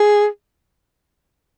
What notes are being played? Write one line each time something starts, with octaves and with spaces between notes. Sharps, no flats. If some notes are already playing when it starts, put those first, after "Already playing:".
Already playing: G#4